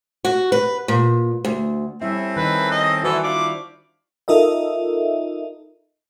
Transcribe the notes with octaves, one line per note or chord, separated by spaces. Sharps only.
F#4
B4
A#2
D2
G3 C4 C#4 E4 A4 E5
D#3 D#4 B4
D#5
E3 F#4 A4 C5 D5
D4 E4 F4 D6
D#4 F4 A4 A#4 D#5 E5